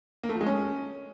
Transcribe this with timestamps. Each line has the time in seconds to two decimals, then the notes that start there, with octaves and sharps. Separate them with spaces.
0.23 A#3
0.29 A3
0.35 F3
0.41 G#3
0.46 C#4